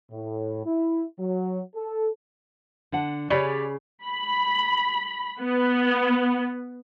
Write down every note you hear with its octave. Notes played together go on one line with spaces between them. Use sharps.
A2
E4
F#3
A4
D3 D4 F#5
C#3 G4 G#4 C#5 D5 G#5 B5
B5
B3